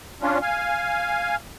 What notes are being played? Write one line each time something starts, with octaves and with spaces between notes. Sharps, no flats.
C#4 D4 F4
F5 G#5